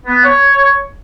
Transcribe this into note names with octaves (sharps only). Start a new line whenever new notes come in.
B3
C#5